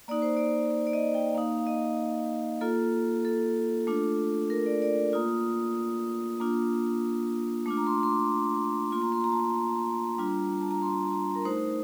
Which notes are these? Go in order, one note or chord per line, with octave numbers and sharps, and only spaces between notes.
A#3 D#4 D5
C5
D5
D5
D5
D#5
G5
A#3 D#4 F5
F5
D#5
A#3 F4 A4
A4
A3 D4 F4
A#4
D5
D5
A#3 F4 D#6
A#3 D4 F4
A3 D4 F4 D6
A#5
C6
C6
D6
A#3 F4 C6
A#5
C6
A#5
A5
A#5
G3 D4 F4
A5
A#5
C6
A#5
A#4
A3 D#4 C5